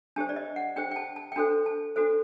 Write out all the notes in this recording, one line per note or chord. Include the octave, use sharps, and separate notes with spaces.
D4 G4 C5 A5
D5
D#5
F#5
D4 G4 C5 G5
G5
A5
A5
G5
D4 F#4 A4 C5 A5
A5
D4 F#4 A4 C5